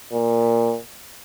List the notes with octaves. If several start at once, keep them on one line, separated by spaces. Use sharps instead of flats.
A#2